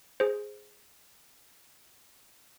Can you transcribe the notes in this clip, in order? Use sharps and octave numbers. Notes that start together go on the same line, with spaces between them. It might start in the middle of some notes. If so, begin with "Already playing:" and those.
G#4 C5